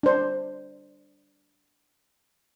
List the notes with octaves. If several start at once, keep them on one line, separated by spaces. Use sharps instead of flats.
D4 C5